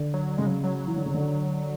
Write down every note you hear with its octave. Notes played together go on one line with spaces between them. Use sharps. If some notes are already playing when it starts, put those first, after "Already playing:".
Already playing: D3
F#3
C#3 G#3
F#3
F#3
E3
D3
C#3
D3